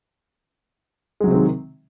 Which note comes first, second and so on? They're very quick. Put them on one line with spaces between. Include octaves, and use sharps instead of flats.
G#3 F#3 C3 C4 D#3